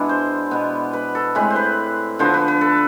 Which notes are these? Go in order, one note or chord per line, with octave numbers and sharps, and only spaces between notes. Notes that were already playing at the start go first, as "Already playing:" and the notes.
Already playing: B2 G#3 B3 D4 E4 G#4
C5
B2 B3
B4
A4
A2 G#3 C4 B4
C5
B4
D3 F3 B3 C5
B4
B4
A4